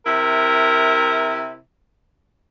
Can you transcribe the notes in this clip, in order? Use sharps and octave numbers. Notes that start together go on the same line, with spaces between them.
C3 E4 A#4